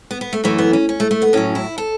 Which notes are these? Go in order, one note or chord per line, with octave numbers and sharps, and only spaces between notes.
B3
B3
A3
F#2 E3 A3
B3
C#4
C#4
A3
A3
B3
A2 F#3 C#4
E4
A4